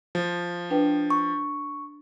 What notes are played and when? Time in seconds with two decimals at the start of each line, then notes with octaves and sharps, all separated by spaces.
0.15 F3
0.70 D4 B4 G5
1.10 C#6